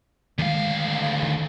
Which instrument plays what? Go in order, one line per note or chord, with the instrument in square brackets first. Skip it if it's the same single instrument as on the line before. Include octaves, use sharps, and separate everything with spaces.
[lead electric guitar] D2 F5 [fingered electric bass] D#3 G#3
[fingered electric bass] D#3